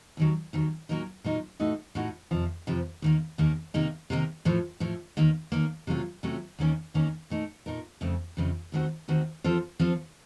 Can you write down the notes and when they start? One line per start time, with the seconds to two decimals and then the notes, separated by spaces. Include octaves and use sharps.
0.17 D#2 D#3 F#3
0.53 D#2 D#3 F#3
0.89 A#2 F#3 A#3 D#4 A#4
1.24 A#2 F#3 A#3 D#4 A#4
1.60 A2 A3 D#4 F#4
1.95 A2 A3 D#4 F#4
2.31 F2 C3 F3
2.67 F2 C3 F3
3.02 D#2 D#3 A#3
3.38 D#2 D#3 A#3
3.74 C3 D#3 A#3 D#4
4.10 C3 D#3 A#3 D#4
4.45 A2 F3 A3
4.80 A2 F3 A3
5.17 D#2 D#3 A#3
5.52 D#2 D#3 A#3
5.87 C3 F#3 A3 C#4 F4
6.23 C3 F#3 A3 C#4 F4
6.59 D#2 D#3 A#3 C#4
6.94 D#2 D#3 A#3 C#4
7.30 A#2 A3 D#4 A#4
7.66 A#2 A3 D#4 A#4
8.01 F2 C#3 A3
8.37 F2 C#3 A3
8.72 D#2 D#3 A3 C4 F#4
9.08 D#2 D#3 A3 C4 F#4
9.44 F3 C4 F4 A4 C5
9.79 F3 C4 F4 A4 C5